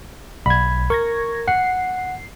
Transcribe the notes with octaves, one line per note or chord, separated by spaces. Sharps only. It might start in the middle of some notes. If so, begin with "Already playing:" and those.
B1 B5 G#6
A#4 C#6 G#6 A#6
F#5 C7